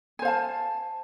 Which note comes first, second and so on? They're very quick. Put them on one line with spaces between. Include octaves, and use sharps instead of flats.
G#5 C5 F5 A5